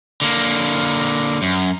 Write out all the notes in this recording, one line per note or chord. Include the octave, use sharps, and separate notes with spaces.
D3 A#3
F#2